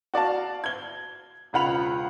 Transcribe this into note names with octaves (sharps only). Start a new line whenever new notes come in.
F#4 D5 F5 A5
G#6 G7
E1 C#2 F4 F#5 B5 F7